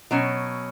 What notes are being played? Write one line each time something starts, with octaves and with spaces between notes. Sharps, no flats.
B2 F#3 C#4